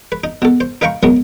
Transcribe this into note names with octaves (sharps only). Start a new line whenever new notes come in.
B4
D#4
B2 A4
C5
D#4 B4 F5 G5 A#5 C#6
F#3 G#3 B3 A#4